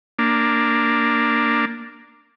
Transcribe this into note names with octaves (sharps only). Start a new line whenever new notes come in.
A#3 D4